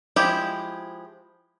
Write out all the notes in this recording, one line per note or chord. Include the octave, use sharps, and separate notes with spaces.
F3 G#3 E4 G4